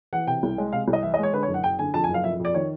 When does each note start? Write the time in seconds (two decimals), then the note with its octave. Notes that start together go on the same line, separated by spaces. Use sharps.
0.13 E3 F#5
0.27 C3 G5
0.43 C2
0.58 G#3
0.73 C3 F5
0.88 C2
0.93 D#5
1.03 E3 E5
1.14 D#5
1.18 G#3
1.23 C#5
1.33 D3 B4
1.43 C#5
1.48 F#1
1.54 F#5
1.64 F#1 G5
1.79 D3 G#5
1.94 F2 A5
2.04 G#5
2.09 F#1
2.14 F5
2.24 F2 E5
2.40 F2
2.45 D5
2.55 D#3 C#5